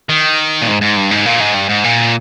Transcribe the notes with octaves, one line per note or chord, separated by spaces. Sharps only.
D#3
A#2
G#2
G#2
G2
G#2
A#2
G#2
G2
G#2
A#2